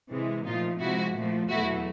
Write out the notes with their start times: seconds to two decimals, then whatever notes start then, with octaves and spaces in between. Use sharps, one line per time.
0.10 C3 E3 G#3
0.45 A#2 F3 A3 D#4 F4
0.80 C3 F3 G#3 E4 F#4
1.15 A#2 F3 A3
1.49 E2 B2 F#3 A3 E4 F#4